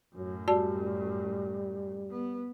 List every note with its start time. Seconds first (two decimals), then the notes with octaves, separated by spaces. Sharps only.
0.16 F#2 A2 F#3
0.48 G3 F#4 D5 A5
2.10 B3